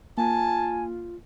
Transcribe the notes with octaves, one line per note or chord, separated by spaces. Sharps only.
A#3 F4 G#5 A5